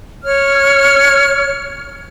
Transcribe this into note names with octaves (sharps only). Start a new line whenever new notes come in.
C#5 F6